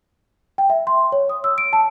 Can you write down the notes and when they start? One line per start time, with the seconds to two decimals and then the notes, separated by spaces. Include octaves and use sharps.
0.58 G5
0.70 E5
0.87 C6
1.12 C#5
1.30 D#6
1.44 E6
1.58 D7
1.73 A5